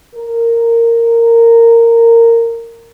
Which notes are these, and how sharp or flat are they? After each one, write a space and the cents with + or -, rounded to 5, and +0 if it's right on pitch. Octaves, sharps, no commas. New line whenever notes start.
A#4 -15